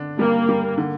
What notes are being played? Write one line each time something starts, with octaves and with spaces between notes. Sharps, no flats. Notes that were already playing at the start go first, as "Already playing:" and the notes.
Already playing: D3 D4
G3 A#3
G3
D3